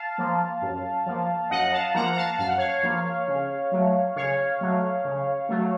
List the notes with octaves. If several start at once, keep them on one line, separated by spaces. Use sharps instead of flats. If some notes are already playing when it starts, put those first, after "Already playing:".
Already playing: F5 A5
F3 A#3
F#2
F3 A#3
F#2 D#5 F#5
F5 A5
F3 A#3 F#5 A#5
A#5
F5 A5
F#2 F5
F#5
C#5 F5
F3 A#3
C#3
F#3 A3
C#3 C#5 F5
F#3 A3
C#3
F#3 A3